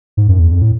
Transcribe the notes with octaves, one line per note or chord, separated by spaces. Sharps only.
G#2
F#2
E2
F2
A2